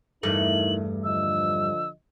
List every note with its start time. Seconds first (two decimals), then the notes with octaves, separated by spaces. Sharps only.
0.23 E2 G2 A3 D#4 E4 A#4 F#7
1.04 D3 F3 D#5 E6